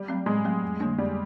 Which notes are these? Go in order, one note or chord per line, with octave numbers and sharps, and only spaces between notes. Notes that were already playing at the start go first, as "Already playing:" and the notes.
Already playing: G3
F#3 A3 C4
A2 G#3
F#3 A3 C4
F2
D3 G3 A#3 D4
F2 G3